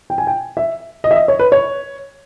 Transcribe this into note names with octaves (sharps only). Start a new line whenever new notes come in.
G5
G#5
G5
E5
D#5
E5
D#5
C#5
B4
C#5